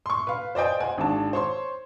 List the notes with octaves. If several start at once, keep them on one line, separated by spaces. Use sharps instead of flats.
C6 C#6
B4 F5
C5 D5 D#5 G5 G#5
C5 F#5 G#5
G#1 D4 A5
C5 C#5 C6